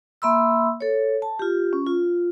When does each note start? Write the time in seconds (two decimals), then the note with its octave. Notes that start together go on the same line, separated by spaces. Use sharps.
0.22 A#3 E5 B5 C6 E6
0.81 A4 C#5
1.22 A5
1.39 F4 G4
1.73 C#4
1.86 F4